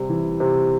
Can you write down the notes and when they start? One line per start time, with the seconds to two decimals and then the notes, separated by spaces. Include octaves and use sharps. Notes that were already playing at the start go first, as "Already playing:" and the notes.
Already playing: C3 G3
0.09 E3
0.40 C3